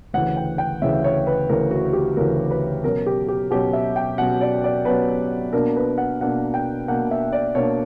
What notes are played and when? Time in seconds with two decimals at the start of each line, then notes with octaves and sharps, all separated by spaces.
0.14 D2 C#3 E3 F#5
0.36 G5
0.58 G5
0.82 D2 C#3 E3 E5
1.04 C#5
1.27 B4
1.48 D2 C#3 E3 A#4
1.71 F#4
1.93 G4
2.17 D2 C#3 E3 A#4
2.50 B4
2.83 B2 F#3 C#4 A#4
3.06 G4
3.28 G4
3.50 B2 F#3 C#4 G4
3.73 E5
3.96 G5
4.18 B2 F#3 C#4 F#5
4.41 D5
4.64 D5
4.85 B2 F#3 C#4 B4
5.53 B2 A#3 D4 A#4
5.76 B4
5.98 F#5
6.21 B2 A#3 D4 F#5
6.54 G5
6.88 B2 A#3 D4 F#5
7.11 E5
7.33 D5
7.55 B2 A#3 D4 C#5